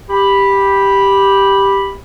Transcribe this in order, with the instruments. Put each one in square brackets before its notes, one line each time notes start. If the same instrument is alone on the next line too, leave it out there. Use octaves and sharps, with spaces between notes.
[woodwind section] G4 B5